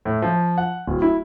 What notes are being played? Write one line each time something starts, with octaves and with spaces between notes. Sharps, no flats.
A2
F3
F#5
D1
E4